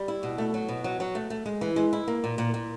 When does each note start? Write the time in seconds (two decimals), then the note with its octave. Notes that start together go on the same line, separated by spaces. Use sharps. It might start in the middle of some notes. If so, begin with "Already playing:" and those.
Already playing: G3
0.08 E4
0.23 B2
0.38 A3
0.54 F#3
0.69 B2
0.84 F#3
1.00 F#3
1.15 A3
1.30 A3
1.46 G#3
1.61 E3
1.76 G#3
1.93 E4
2.08 A#3
2.24 A#2
2.38 A#2
2.54 A#2